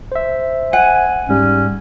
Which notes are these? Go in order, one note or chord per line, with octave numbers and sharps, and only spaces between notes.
C5 E5
F#5 G#5
G#2 G3 C#4